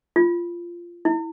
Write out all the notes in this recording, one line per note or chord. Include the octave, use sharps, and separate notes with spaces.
F4
E4